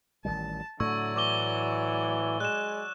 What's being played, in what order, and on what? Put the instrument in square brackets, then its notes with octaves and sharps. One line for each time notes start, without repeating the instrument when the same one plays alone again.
[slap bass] A1 D#3 G3 [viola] A5
[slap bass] A2 A3 [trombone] D3 [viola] F#3 D5 [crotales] C#6 E6 G#6
[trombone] E3 [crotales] C#6 D6 G7
[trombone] G#3 [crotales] F#6 E7